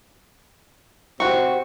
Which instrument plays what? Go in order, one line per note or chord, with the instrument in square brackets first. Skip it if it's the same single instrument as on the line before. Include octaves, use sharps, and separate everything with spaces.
[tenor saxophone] C3 [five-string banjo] C4 F#4 [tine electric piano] C#6